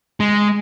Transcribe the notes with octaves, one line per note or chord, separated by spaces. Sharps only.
G#3